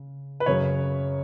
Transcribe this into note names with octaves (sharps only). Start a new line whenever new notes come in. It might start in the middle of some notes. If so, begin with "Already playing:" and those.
Already playing: C#3
B4
F#2 C#3 F#3 C#5